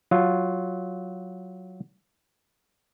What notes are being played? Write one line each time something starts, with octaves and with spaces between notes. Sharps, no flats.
F#3 F4